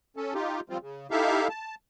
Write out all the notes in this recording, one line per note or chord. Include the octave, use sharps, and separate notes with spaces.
C#4 A4
D#4 F4 G4
F3 G3 C4 F4
C#3
D#4 E4 G4 A4 E5 F5
A5